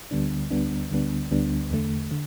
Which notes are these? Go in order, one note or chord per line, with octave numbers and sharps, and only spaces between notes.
D2 D3 G3 B3 D4
D2 D3 G3 B3 D4
D2 D3 G3 B3 D4
D2 D3 G3 B3 D4
E2 D3 A3
D3